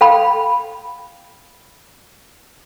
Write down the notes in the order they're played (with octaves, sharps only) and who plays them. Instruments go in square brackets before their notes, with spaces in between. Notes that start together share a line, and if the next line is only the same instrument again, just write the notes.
[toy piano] A4 F5 G5 B5